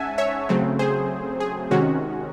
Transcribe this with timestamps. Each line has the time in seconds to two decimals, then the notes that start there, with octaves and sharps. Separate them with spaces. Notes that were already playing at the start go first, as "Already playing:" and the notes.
Already playing: G#2 C#4 E5 F#5 G#5 A5
0.18 C#5 E5
0.49 C#3 F#3 A3 C4
0.79 G#4 C5
1.40 G#4
1.71 C3 D#3 G#3 C#4 F#4